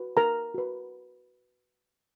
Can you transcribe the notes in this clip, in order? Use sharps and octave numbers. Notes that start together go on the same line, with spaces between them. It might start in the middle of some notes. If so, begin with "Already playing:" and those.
Already playing: F#4 B4
A#4 A#5
F#4 B4